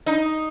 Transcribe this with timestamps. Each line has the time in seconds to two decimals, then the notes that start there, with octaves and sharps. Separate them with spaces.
0.06 D#4